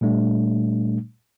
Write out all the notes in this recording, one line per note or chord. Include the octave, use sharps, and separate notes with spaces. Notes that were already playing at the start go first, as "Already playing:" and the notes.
A#2 G3 A3 D4